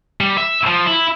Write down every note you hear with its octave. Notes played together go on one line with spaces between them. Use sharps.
G3
E5
F3
E4